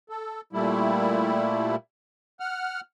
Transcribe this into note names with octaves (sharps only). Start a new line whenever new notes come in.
A4
A#2 G3 A3 E4
F#5 F6